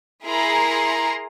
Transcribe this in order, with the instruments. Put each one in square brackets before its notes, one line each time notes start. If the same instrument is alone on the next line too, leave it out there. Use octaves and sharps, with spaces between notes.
[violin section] E4 G#4 A#4 A#5 C6